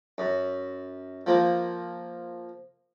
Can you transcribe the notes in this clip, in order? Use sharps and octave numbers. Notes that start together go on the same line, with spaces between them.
F#2
F3 A#3